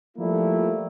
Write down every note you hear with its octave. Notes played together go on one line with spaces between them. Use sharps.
F3 G3 A3 A#3 E4